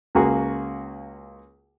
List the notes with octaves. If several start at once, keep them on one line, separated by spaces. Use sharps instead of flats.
C#2 A#3 F#4 G#4